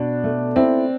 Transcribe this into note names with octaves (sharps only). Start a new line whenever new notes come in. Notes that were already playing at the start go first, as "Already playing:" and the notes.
Already playing: B2 D4
A3
C4 E4